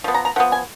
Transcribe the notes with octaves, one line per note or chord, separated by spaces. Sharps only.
F3 B3
A#5
A#5
F3 B3 F#5
G#5